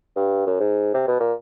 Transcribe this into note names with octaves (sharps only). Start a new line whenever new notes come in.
G2
F#2
G#2
C3
B2
A#2